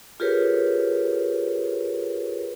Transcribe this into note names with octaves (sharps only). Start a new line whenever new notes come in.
F4 G4 G#4 A#4 B4 C#5